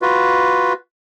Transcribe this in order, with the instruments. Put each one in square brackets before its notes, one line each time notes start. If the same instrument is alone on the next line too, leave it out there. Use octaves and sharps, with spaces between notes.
[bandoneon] F4 F#4 B4